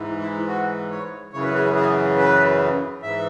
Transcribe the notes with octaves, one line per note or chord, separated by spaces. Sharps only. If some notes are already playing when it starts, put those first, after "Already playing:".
Already playing: G#2 E3
E4
F#4
C#5
F#2 C#3 E3 C#5
B4
G#4
B4
G#4
B4
G#2 E3 E5